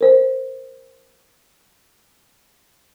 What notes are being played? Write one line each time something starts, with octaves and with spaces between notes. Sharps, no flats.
A#4 C5